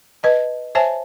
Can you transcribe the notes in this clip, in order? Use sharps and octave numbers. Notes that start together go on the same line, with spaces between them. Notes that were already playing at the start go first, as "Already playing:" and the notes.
B4 D#5 A5
C5 C#5 E5 G#5 A5